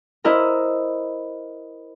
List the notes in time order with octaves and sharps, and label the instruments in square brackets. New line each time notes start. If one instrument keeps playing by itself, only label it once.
[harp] E4 A#4 C5 D#5 A#5